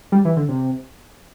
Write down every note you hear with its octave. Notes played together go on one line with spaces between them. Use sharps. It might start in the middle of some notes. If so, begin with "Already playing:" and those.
G3
E3
D3
C3